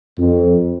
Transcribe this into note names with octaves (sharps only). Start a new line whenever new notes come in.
F2